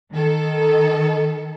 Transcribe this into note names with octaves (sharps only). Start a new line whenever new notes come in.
D#3 A4